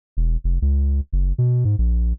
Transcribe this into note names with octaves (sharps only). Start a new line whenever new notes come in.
E1
F1
C#2
F#1
B2
G#2
A#1